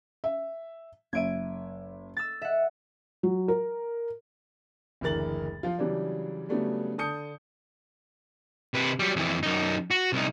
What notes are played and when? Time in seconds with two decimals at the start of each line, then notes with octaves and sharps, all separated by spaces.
0.24 E5
1.13 F#1 E5 G#6 D7 D#7
2.17 E6 A6
2.42 E5 F#5
3.23 F#3
3.48 A#4
5.01 F#1 D2 E3 A#4 A6 F#7
5.63 F3 F4
5.78 C#3 E3 F#3 G3 D4
6.49 C#3 F#3 G3 A3 B3 D4
6.98 D3 A5 D#6 G6 C#7
8.74 C3 B4
8.99 F#3 G3
9.16 F2 E3
9.43 F#2 D#4
9.91 F#4
10.13 C2 D#4